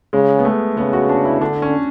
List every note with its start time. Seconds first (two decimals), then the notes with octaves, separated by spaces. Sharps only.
0.13 C#3 G#3
0.39 B3
0.45 A3
0.77 C#3 B3
0.93 F#4
1.09 D4
1.25 E4
1.41 D3 D4
1.62 C#4